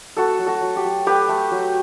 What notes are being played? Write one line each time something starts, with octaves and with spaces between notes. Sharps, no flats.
A3 F#4 A4
F#3
F#4 A4
F#3
G4
F#3
A3 G4 B4
A3
F#3